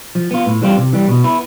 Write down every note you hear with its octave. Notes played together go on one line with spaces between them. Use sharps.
F3
B3 F4
A2
E3 G3 C4 F4
C3
E3 G3
B2
B3 E4